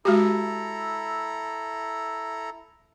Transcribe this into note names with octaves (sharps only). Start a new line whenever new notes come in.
G#3 E4 F#4 G4 A4 A#5